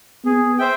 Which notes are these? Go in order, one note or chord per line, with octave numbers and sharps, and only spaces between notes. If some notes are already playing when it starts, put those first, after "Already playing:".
B3 G#4
C5 E5 G5